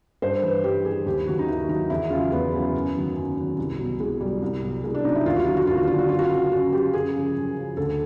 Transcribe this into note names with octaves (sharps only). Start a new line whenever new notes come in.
G2 C5
E3 B4
G2 G4
E3 G#4
D#2 G4
D#3 F#3 F#4
D#4
D#2 E4
D#3 F#3 D#4
E2 E4
C#3 F#3 F4
E2 B3
C#3 F#3
F#2
D#3 F#3
F#2
D#3 F#3
C2
B2 F#3
C2 G#3
B2 F#3 G3
C2
B2 F#3
C2 G#3
D4
B2 F#3 D#4
E4
D#2 F4
F#4
D3 F#3 F4
F#4
D#2 F4
F#4
D3 F#3 F4
F#4
F#2 F4
F#4
C#3 F#3 F4
F#2 F#4
C#3 F#3 G4
F#2 G#4
C#3 F3
F#2
C#3 F3
D2 A4